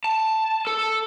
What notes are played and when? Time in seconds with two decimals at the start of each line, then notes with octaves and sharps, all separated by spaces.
0.04 A5
0.67 A4